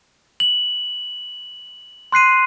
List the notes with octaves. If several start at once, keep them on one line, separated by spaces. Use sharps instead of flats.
F#7
C6 F#6 C7 D#7